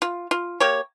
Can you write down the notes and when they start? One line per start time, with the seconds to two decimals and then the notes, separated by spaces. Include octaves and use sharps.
0.02 F4
0.31 F4
0.60 A#3 G4 C#5